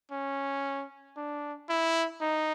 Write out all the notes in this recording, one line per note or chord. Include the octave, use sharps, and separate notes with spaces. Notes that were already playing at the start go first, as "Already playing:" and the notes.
C#4
D4
E4
D#4